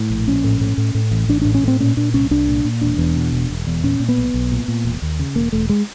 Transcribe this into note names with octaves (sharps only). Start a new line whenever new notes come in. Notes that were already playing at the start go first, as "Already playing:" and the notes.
Already playing: A2
A#1
A#1 C#4
A2
A2
A2
A2
A1
A1 D4
A2 D4
C#4
A2 C4
A#2 C#4
A#2 D4
C2 C#4
C2 D4
A#2
A#2
E1 D4
E2
B2
E1
E1
E2
A#2 C#4
A#2
B3
B1
B1
A#2
A#2
E1
D#2
C#3
E1 A#3
E1 A3
G#3